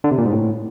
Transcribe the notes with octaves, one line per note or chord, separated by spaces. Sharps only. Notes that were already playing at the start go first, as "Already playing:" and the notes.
D3
C3
A#2
G#2
A2